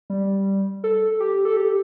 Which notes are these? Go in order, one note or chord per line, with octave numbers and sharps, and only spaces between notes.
G3
A4
G4
A4
G4